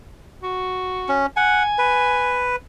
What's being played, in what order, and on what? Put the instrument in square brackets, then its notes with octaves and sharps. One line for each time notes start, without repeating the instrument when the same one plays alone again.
[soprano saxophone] F#4
[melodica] C#4
[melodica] F#5 [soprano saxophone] G#5
[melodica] B4